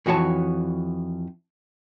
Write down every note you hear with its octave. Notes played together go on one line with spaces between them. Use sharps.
F2 E3 F#4 C#5 A5